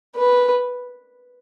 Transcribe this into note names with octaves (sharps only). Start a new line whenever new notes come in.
B4